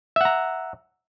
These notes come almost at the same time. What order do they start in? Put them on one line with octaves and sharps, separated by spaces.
E5 F#5 A#5